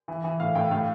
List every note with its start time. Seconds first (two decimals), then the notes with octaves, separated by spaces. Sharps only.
0.08 E3
0.24 E3
0.40 A2 F5
0.55 A2 G5
0.71 A2 F5